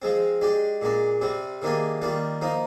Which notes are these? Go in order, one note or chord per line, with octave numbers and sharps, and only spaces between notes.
F3 G#3 C4
G#3 D4 G4
A#2 G#3 D4
C3 G3 C4
C3 D#3 A#3 D4 G#4
D#3 G3 A#3 F4
F3 A#3 D#4